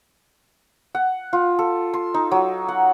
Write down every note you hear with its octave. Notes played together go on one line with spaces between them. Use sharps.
F#5
F4
A4
C6
D#4
F#3
F#5